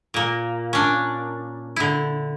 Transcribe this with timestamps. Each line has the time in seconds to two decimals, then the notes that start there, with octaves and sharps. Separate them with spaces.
0.14 A#2 A#3
0.73 C#4 D4
1.76 D3 E4